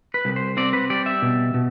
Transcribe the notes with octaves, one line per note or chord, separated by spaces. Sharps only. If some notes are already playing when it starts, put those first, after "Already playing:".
B4
C2
C5
C4 D5
B4
G3 D5
E5
B2
B2